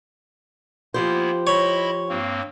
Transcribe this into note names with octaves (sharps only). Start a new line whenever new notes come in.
F3 A#3 B3 E4 G4 C5
E4 C#5 D#5 B5
G2 A#3 C4